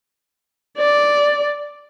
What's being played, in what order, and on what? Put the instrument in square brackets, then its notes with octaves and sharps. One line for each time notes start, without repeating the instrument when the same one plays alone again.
[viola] D5